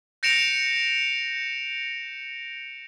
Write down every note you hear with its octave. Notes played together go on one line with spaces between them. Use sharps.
G6 A#6 C#7 D7 E7 F7